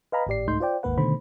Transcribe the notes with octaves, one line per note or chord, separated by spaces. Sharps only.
B4 D#5 F5 G#5 A#5 B5
G#1 A2 G4 D5 C7
C2 G#2 A3 D#4 C6 G6
F4 C5 D5 G5
G#1 D#2 G#2 A#3 B4 F#5
B2 D3 D#3 A3 C5 B5